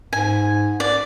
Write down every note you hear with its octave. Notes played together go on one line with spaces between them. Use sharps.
G#2 G#5
D5